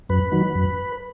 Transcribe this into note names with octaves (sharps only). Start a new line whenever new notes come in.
F#2 B4
D#3 F#3
F#2